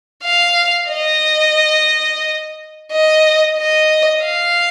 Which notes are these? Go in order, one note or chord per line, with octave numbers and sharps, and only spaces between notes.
F5
D#5
D#5
D#5
F5